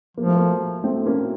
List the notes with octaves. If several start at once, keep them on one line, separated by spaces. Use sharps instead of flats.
F3 A#3
A3
A#3
A3 C4
A#3 C#4